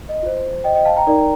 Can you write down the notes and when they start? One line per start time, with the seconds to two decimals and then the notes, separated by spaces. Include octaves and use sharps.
0.09 D#5
0.23 F4 C5
0.64 D#5 G5
0.75 D#5 G5
0.85 F5 A5
0.97 G5 A#5
1.07 D#4 A#4 D5